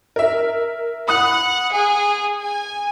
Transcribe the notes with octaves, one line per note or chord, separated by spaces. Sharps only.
A#4 E5
F#5 B5 D#6 F#6
G#4
G#5